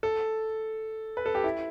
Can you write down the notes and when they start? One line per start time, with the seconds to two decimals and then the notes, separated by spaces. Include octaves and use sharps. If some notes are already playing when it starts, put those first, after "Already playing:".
0.03 A4
1.17 B4
1.26 A4
1.35 G4
1.44 E4